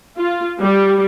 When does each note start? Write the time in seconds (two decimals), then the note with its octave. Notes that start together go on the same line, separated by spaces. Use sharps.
0.18 F4
0.60 G3